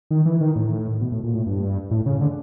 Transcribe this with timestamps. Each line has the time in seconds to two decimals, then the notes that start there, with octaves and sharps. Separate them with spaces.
0.11 D#3
0.26 E3
0.41 D#3
0.56 A2
1.01 B2
1.12 A2
1.24 A#2
1.34 A2
1.46 G2
1.91 A2
2.06 C#3
2.21 D3